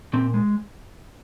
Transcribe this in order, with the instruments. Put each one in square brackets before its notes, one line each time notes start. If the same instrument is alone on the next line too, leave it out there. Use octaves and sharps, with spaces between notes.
[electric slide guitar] A#2 C4
G#3